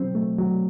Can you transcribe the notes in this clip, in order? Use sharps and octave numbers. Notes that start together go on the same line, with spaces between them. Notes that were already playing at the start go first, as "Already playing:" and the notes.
Already playing: F#3 C4
A3
F#3